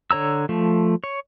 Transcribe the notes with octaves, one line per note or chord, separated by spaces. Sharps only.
D3 C#5 A#5 E6
F3 A3
C#5